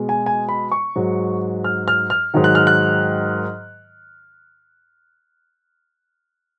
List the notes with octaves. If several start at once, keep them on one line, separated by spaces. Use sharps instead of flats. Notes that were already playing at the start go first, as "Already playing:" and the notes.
Already playing: B2 G#3
G#5
G#5
B5
C#6
G#2 F#3
F6
F6
F6
G#2 D#3 F#3
F#6
F6
F#6